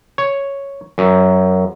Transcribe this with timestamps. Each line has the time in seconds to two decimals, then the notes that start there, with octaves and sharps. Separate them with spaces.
0.18 C#5
0.98 F#2